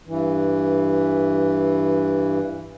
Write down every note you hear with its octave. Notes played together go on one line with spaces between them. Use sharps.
G2 E3